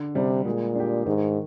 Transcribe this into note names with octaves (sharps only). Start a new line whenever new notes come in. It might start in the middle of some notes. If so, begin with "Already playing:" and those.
Already playing: D3
C3 G3 D4
A#2 G#3
D4 G4
G#2 D#3